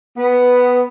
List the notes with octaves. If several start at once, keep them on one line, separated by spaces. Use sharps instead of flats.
B3